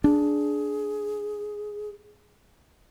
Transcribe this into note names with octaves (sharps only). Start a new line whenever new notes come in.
D4 G#4